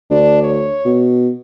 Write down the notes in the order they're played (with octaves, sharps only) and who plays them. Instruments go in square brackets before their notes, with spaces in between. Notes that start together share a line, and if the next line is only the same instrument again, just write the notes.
[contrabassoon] D2 [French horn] D4
[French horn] C#5
[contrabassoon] B2